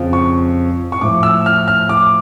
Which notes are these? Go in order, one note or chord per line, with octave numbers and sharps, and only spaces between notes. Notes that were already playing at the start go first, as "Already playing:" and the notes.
Already playing: F2 C#3 F3
C#6
C#6
A2 F3 D6
E6
F6
F6
D6